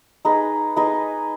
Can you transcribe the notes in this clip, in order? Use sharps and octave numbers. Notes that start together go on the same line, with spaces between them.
D#4 G#4 B4 D#5
D#4 G#4 B4 D#5